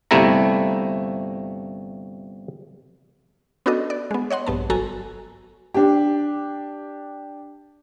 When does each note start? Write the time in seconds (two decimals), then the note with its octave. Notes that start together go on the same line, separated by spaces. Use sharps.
0.11 G1 C3 A3 E4 A#5
3.66 B3 C#4 D4 F#4 A4 D#5
3.90 D5
4.11 G#3 B3
4.30 C#5 D#5 F#5 C6
4.46 A#1 G2 B3 A5
4.70 G1 F#3 F#4 A4 G#5 A#5
5.74 D4 G4